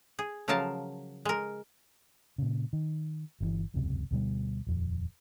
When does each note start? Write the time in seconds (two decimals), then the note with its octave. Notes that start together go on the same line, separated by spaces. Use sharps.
0.19 G#4
0.48 C#3 F3 F#3 A#4 F5 A5
1.25 G#3 A#4
2.38 A#2 C#3
2.73 D#3
3.40 G1 C3 E3
3.74 E1 C#2 F#2 C3
4.11 D2 B2 G3
4.67 D#1 F2